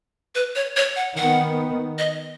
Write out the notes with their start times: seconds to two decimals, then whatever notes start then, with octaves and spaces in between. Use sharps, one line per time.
0.35 B4
0.55 C#5
0.77 C#5
0.96 F#5
1.17 D#3 B3 F#5
1.98 D#5